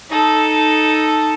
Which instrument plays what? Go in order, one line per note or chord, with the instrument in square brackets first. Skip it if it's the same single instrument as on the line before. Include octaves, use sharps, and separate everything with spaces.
[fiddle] D#4 A4